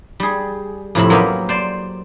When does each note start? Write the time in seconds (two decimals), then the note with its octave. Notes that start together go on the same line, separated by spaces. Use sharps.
0.20 G3 G#4
0.95 F2 A2 C3 E5 B5
1.10 F#3 A#3 B3 C#4 G4
1.49 C5 D5